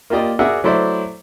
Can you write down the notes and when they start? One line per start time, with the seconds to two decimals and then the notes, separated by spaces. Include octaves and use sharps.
0.10 A#3 F4 G4 D5 D#5
0.39 F#4 G#4 A#4 D5 E5 F#5
0.64 F#3 A3 E4 C5 D5 E5